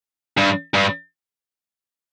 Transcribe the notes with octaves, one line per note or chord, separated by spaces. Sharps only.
G2
G2